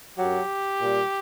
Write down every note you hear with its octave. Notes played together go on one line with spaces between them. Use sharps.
F#2 F#3 G4
A#2 G3